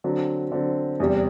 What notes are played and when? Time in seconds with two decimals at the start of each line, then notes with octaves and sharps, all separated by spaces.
0.04 D3 F#3 C4
0.52 D3 F#3 C4
1.00 E2 C3 G3